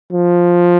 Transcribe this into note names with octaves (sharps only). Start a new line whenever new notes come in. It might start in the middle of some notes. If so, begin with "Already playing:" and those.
F3